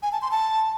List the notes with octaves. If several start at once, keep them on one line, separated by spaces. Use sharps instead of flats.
G#5
A5
C6
A5